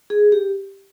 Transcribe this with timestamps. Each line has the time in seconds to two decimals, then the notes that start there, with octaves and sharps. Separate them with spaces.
0.10 G#4
0.32 G4